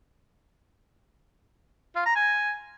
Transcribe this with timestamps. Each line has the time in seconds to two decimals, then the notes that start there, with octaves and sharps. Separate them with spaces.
1.96 F4
2.06 A#5
2.15 G#5